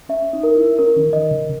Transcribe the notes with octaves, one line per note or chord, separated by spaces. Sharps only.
C#4 E5
D#4
A#4
E4
C#4 A#4
D#3
D#3 D#5
C#3